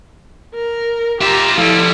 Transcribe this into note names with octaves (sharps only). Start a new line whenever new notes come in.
A#4
F4 G4 E5 A#5
F3 G3 E4 A4